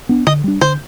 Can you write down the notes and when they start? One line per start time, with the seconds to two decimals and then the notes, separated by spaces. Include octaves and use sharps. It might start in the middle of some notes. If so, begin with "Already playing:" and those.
0.09 B3 D4
0.27 D3 D#5
0.44 G3 D4
0.61 D3 C5